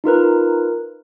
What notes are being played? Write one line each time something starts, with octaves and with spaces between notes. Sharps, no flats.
D#4 F4 A#4 B4